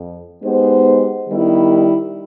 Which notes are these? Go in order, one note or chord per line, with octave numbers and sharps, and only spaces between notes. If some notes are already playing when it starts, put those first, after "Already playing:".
Already playing: F2
G#3 B3 D#4 G4 C5
D#3 G3 B3 E4